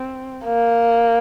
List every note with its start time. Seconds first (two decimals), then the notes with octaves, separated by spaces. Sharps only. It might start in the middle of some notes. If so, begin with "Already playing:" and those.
Already playing: C4
0.45 A#3